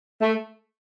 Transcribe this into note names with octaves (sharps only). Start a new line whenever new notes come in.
A3